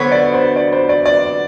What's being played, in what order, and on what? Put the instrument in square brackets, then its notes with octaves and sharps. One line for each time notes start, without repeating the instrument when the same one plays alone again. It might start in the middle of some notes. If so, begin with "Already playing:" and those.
Already playing: [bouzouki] D3 F#3 B3 [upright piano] C5
[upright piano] D5
C5
D5
C5
D5
D5